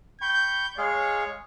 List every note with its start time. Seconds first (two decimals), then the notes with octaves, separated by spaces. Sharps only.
0.21 G5 B5 C#6 G6
0.78 G#3 G#4 C#5 F5